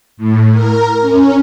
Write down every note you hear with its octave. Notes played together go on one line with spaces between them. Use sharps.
A2
A#4
C#4